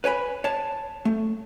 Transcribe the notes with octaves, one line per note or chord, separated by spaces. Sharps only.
B4 C#5 G#5 B5
C#5 A5
A3